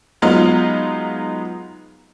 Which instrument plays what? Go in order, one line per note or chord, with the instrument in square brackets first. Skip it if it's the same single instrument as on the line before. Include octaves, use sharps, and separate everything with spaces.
[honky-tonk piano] F#3 G#3 B3 D#4 F4